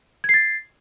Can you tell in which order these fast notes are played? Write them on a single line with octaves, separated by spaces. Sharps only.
G#6 C7 A6